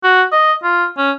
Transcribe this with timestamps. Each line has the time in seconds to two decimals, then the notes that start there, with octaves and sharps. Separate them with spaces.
0.04 F#4
0.32 D#5
0.63 F4
0.98 C#4